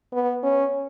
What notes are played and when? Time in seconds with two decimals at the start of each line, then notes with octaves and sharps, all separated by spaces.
0.12 B3
0.43 C#4